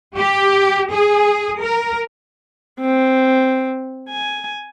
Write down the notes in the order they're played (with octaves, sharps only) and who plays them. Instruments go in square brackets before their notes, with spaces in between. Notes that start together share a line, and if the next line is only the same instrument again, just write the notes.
[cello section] G4
G#4
A#4
[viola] C4
G#5